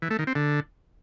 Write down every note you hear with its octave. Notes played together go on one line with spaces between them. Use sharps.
E3
A3
D#3
C4
D3